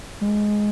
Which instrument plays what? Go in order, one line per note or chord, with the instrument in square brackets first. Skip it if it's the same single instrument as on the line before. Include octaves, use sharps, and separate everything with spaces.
[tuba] G#3